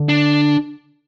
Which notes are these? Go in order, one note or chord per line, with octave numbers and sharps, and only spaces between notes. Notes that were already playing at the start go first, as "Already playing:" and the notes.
Already playing: D3
D4